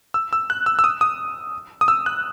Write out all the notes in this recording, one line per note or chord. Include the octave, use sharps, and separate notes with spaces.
E6
E6
F#6
E6
E6
D#6
D#6
D#6
E6
F#6